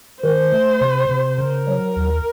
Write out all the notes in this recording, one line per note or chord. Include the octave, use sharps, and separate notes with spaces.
D#3 C5
A3
C3
C3
C#3 A#4
F#3
D#2